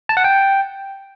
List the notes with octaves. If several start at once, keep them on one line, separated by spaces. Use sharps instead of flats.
A5
F#5
G5